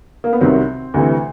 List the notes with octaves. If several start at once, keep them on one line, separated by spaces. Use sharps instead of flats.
A#3
B3
C2 C3 D#3 F#3 C4
D2 C3 E3